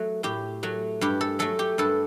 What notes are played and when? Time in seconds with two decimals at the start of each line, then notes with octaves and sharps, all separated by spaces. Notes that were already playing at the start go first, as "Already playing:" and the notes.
Already playing: F#3 A3 A4
0.23 A2 G4
0.63 F#3 A3
1.01 G2 G4
1.21 A4
1.39 F#3 A3 A4
1.59 G4
1.78 G2 A4